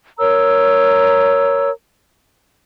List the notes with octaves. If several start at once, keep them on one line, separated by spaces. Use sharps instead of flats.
A#4 C#5 A#5 E6